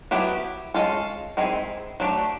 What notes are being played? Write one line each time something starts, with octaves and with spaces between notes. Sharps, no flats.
F#3 B3 E4 G4
G#3 C#4 F4 A4
D#3 G#3 C4 E4 G#4
F#3 A3 D4 G4